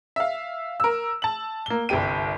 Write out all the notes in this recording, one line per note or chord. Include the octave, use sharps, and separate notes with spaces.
E5 F5
A#4 E6
A5 F#7
A#3 G7
G1 C2 G4 G5 D#7